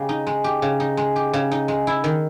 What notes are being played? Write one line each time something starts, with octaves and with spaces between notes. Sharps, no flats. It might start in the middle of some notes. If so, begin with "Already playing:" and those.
Already playing: C#3 G#3 G4
D#4
G#3
G4
C#3
D#4
G#3
G4
C#3
D#4
G#3
E4
D#3